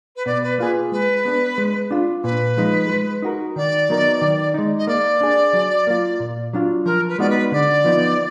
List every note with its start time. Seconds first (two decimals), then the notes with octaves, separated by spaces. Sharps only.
0.16 B4
0.26 B2 D5
0.43 B4
0.58 A#3 F4 G#4 B4
0.92 G#3 B4
1.25 B3 D4
1.58 G#3
1.91 D4 F4
2.23 A#2 B4
2.57 F3 G#3 D#4
2.90 G#3
3.22 D#4 F#4 A#4
3.56 D#3 D5
3.89 F#3 B3 D#4 A#4
4.21 D#3
4.54 G#3 D#4
4.78 D#5
4.87 A#3 D5
5.21 D4 G#4
5.54 F#3
5.87 A#3 F4
6.20 A#2
6.53 F#3 D4 F4
6.85 F3 A#4
7.08 B4
7.19 G#3 B3 D#4 F#4 D5
7.29 B4
7.52 D3 D5
7.85 F3 B3 D#4